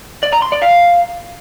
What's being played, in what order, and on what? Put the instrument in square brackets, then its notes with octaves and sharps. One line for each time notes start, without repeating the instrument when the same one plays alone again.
[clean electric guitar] D5
A#5
C6
D5
F5